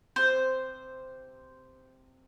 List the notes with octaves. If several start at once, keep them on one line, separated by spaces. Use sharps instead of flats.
C3 C5